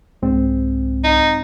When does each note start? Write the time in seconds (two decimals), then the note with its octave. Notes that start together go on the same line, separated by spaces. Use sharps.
0.22 C2 G#2 C4
1.04 D#4